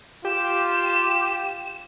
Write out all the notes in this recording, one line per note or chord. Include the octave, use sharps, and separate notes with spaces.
F4 G4 E7